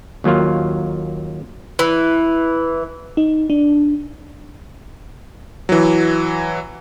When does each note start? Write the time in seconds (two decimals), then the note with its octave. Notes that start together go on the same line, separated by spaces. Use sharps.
0.24 D#2 F#3 A#3 F4
1.79 E3
3.17 D#4
3.50 D4
5.69 E3 F#3